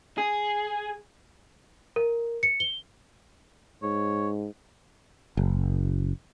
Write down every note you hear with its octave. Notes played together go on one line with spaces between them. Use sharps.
G#4
A#4
C#7
G7
G#2 C#5
F#1